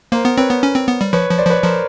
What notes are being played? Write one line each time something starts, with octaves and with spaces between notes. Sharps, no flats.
A#3 A#4 C5
B3
C4 B4 C#5
B3
C#4
C4
B3
G3
F3 B4 C#5
F3
C5 D5
F3 B4 C#5
F3 A#4 C5